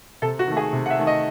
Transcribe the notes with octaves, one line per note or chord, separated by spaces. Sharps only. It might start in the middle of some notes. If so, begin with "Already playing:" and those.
C3 A4
F#4
D#3 A3
G#4
C3
F#5
E5
D#3 A3
D#5